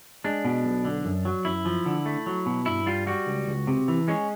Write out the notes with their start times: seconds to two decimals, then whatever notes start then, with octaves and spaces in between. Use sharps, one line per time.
0.24 G#3 D4
0.45 B2
0.64 B1
0.85 D3
1.05 F#2
1.25 F#3
1.45 F#2 E4
1.65 F3
1.86 D3
2.06 A3
2.26 F#3
2.46 B2
2.66 G2 E4
2.86 G3 F4
3.07 G3 F#4
3.27 C#2
3.47 C#2
3.67 C3
3.88 E3
4.08 G#3 C#4